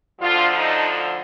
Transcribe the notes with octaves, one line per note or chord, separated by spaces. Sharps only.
D2 D3 F3 F4
D#4